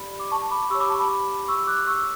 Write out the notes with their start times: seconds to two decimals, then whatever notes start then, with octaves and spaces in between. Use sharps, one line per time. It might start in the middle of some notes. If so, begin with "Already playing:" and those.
Already playing: G4 D5 B5
0.20 D6
0.31 A5 C#6
0.51 B5 D6
0.70 G4 C#5 C#6 E6
0.80 B5 D6
0.89 A5 C#6
0.99 B5 D6
1.48 C#6 E6
1.67 D6 F#6
1.87 C#6 E6